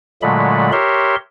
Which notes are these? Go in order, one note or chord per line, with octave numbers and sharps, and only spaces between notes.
A#2 D3 F#3 G#3 A3 B5
G4 A#4 C#5 E5 C6